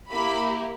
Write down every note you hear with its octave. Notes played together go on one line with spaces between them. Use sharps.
A#3 E4 G4 B5